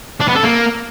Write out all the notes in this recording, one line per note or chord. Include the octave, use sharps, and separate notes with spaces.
D4
B3
A4
A#3